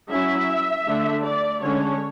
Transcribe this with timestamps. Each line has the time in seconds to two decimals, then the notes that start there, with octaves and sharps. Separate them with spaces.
0.10 F#3 C#4 E4 E5
0.86 D3 A3 D4
1.25 D5
1.63 D3 G#3 C#4 C#5